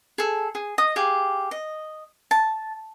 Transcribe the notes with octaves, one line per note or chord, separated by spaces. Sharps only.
G#4 A4
G#4
D#5 D#6
G4 G#4 F5
D#5
A5